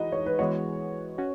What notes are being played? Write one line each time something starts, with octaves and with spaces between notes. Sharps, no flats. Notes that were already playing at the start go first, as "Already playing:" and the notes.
Already playing: E3 G#3 D#4 F#4 B4 D#5
C#5
B4
E3 G#3 B3 F#4 C#5
C#4 F#4